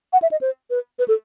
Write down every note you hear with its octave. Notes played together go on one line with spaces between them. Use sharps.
F#5
E5
D#5
C5
B4
B4
A4